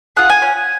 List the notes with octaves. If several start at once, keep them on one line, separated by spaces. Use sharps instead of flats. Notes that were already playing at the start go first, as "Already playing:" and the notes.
F4 G#4 F#5
G#5
C#4